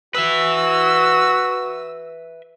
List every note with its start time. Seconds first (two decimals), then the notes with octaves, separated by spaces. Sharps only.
0.15 F#4 B4 E5 E6